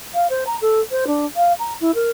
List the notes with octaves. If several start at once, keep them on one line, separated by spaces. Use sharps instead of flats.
F5
C5
A#5
A4
C5
D4
F5
A#5
E4
A#4